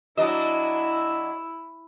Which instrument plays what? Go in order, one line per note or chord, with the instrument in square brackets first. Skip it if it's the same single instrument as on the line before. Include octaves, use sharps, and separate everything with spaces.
[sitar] F#3 D4 D#5 [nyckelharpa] E4 E5